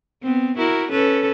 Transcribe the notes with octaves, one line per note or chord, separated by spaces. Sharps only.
B3 C4
E4 F#4 A#4
C#4 A4 B4